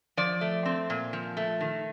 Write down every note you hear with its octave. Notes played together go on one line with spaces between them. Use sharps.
F3 D5
A3
C4
A#2
F3
A3
D#3